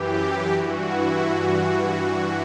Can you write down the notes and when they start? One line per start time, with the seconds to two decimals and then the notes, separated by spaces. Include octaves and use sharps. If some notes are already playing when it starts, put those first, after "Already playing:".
Already playing: F#2 E3 G4
0.49 G2 E3 F#4
0.86 E4
1.23 G2 E3 F#4